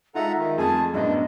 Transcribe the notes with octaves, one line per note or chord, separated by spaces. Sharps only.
G#3 D#4 F4 A4 E5 F#5 A#5
D#3
F2 A3 G#4 G#5 A5
F#2 A2 B3 D4 D#5